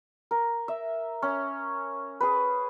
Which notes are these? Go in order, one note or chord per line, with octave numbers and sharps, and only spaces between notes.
A#4
E5
C#4
G#4 B4